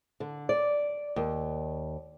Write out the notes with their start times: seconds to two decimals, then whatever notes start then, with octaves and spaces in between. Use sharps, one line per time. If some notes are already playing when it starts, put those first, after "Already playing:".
0.20 D3
0.49 D5
1.16 D#2